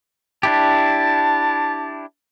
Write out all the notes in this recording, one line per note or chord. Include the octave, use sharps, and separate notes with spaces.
D4 E4 G4 A5